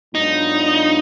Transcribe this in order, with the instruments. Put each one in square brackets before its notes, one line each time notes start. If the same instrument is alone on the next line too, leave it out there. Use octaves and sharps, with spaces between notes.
[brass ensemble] G#2 F#3 B3 D4 F4 [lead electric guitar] D#4